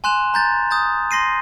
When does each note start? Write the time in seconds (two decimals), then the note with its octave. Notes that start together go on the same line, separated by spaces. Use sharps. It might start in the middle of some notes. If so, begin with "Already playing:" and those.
0.04 G#5 C6 F#6 E7 F7
0.34 A#5 G6 A6
0.71 D#6 G6 A6
1.11 C6 A#6 C7 D#7